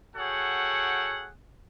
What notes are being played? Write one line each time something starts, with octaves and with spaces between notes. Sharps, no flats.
F#4 G#4 A4 C#5 F#5 G5